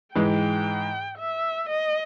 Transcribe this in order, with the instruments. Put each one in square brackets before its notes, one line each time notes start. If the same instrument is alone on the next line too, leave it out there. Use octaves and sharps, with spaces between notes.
[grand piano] G#2 E3 G#3 [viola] G5
[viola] E5
D#5